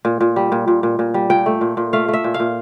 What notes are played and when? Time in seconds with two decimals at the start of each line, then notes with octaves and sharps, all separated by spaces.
0.05 A#2
0.21 A#2
0.36 G3
0.52 A#2
0.68 A#2
0.83 A#2
0.99 A#2
1.14 G3
1.30 A#2 G5
1.46 A3
1.61 A#2
1.77 A#2
1.93 A3 F5
2.08 A3
2.13 E5
2.24 A#2
2.34 F5
2.40 A#2